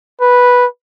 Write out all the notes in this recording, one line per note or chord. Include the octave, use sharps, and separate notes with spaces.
B4